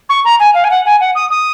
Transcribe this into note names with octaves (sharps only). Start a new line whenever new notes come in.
C#6
A#5
G#5
F5
G#5
F#5
G#5
F#5
D#6
D#6